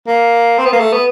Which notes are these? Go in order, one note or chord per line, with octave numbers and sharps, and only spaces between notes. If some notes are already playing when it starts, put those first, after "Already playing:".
A#3
C4
B3
A#3
A3
B3